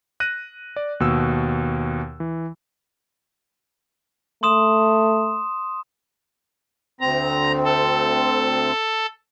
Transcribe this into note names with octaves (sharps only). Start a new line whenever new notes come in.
F#6 A#6 D#7
D5
D#2 B2 E6
E3
A3 C6 D#6 E7
D2 C4 A#5
A4